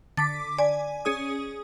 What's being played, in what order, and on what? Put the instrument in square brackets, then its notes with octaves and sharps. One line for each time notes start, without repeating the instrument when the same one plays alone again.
[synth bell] D3 D6 B6 [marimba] A6
[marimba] D5 [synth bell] G#5
[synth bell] C#4 G#4 D#6